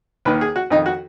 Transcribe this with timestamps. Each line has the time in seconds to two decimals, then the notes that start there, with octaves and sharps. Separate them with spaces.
0.25 D#2 D#3 B4
0.41 G#4
0.56 F#4
0.70 F2 D#3 D#4
0.86 F#4